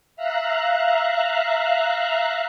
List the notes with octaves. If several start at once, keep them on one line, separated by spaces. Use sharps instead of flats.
E5 F5 A#5 F#6